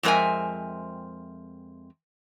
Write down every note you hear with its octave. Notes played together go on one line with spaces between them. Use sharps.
F2 G#3 C4 A#4 E5 G#5